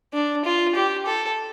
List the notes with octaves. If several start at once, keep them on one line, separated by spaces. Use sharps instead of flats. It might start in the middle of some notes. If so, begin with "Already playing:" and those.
D4
F4
G4
A4